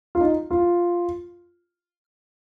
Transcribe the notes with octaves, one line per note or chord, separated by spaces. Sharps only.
F4
D#4
F4